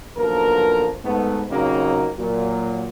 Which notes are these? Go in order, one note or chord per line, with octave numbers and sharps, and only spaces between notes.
B1 D3 F3 A#3 A#4
G#2 A3 B3
A#2 C#3 F#3 A#3 C4 D#4
A#2 F#3